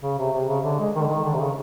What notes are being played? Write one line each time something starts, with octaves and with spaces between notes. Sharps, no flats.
C#3
C3
C3
C#3
D3
G#3
D#3
D3
D#3
D3
C3
C#3